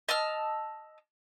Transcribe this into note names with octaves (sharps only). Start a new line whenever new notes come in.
D#5 A5 E6 F6